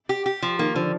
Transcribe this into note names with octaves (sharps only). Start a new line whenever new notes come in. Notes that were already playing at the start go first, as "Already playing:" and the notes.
G4
G4
F3
D#3 A#3
D3 F3